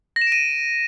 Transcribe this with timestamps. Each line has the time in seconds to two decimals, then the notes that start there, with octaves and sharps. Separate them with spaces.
0.16 A#6
0.22 E7
0.27 D7
0.32 D#7